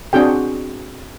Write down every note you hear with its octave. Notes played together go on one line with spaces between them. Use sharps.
C4 D4 F#4 G#4 G5